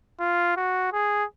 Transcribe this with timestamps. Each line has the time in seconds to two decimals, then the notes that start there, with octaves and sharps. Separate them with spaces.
0.20 F4
0.56 F#4
0.93 G#4